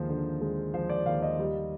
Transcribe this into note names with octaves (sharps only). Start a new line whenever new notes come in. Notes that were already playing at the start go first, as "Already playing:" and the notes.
Already playing: D#2 F3 G#3 C5
D3
G#3
F3 C5
D5
D#2 F5
D#5
G3